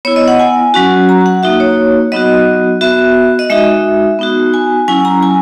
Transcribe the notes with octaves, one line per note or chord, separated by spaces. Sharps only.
B3 E4 C#5
D#5
F#5
G#5
F#3 C#4 F#4
A#5
F#5
A#3 D#4 F#4 E5
C#5
F#3 B3 D#4 F#4 D#5
B3 F#4 E5
D#5
G#3 D#4 F#4 E5
B3 D#4 F#4
G#5
F#3 C#4 E4 G#5
A#5
G#5